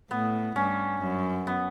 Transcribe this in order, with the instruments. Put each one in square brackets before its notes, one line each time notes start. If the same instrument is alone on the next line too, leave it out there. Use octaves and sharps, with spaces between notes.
[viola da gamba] A2 [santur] B3
[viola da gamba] G2 [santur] C#4
[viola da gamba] F#2
[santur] B3